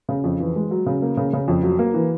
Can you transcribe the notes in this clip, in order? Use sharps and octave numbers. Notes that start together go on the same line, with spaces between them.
C#3
F2
E3
G#3
F#3
C#3
A#3
C#3
C#3
F2
F#3
A#3
E3